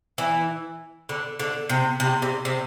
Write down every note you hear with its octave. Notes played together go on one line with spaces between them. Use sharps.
E3
D3
D3
C3
C3
C3
C3